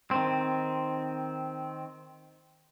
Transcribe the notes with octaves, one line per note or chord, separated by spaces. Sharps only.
D#3 C4